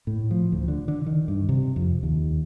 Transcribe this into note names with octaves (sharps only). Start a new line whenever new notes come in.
A2
F3
D2
D3
D3
D#3
G2
C3
F2
D#2